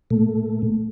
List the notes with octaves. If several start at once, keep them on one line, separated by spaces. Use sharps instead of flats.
A#2 A3